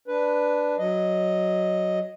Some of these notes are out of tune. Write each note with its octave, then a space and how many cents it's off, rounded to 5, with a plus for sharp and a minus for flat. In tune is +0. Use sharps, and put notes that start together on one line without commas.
D4 +0 B4 +5
F#3 +0 D#5 -5